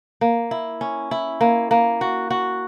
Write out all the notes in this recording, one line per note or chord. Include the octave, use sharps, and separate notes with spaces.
A#3
E4
C#4
E4
A#3
A#3
F#4
F#4